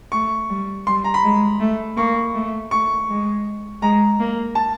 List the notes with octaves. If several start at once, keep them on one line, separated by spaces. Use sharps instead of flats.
A3 C#6
G3
G3 C6
A#5
B5
G#3
A3
A#3 C#6
A3
A3 C#6
G#3
G#3 A#5
A#3
A5